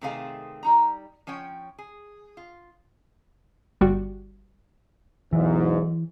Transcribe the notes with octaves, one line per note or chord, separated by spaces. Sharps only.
C3 D#3 A3 C4 G#4 F5
G3 D#4 A#5
F3 C#4 C#5 G5
G#4
F4
G1 G3 F#4
B1 E2 G#2 E3